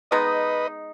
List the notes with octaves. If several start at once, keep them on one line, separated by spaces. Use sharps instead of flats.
G#3 B3 D#4 B4 D#5